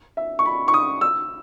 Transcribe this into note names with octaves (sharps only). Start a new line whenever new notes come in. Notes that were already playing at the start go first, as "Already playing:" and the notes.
E5
C#6
B5
C#6
D#6
E6